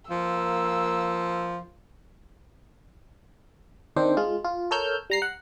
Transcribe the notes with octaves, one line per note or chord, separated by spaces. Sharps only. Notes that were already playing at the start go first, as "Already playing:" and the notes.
F3 A#3 E6
D#3 C4 D4 C5
G#3 F4
F4
A4 A#4 C#5 E6 F6 G6
G3 A#5 C7
F#5